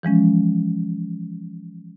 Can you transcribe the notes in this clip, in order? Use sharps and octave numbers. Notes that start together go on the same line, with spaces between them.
E3 F3 G#3 C#4